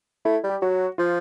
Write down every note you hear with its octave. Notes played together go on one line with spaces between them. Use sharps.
A3 E4
G3
G4
F#3 F#4
F3 F4